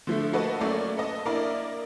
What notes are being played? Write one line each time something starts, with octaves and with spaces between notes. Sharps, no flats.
D3 F3 A3
A#3 F#4 A4 B4 D#5 A5
F#3 A3 A#3 C#4 D5
A4 B4 D#5 A5
A#3 D4 E4 A#4 D5 D#5